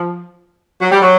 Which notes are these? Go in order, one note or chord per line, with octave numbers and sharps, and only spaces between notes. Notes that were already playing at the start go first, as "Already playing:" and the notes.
Already playing: F3
F#3
G3
F#3